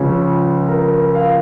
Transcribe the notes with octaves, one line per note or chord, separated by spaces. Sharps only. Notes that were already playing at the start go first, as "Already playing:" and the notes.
Already playing: C#2 C#3 F3 C#5
A#4
F5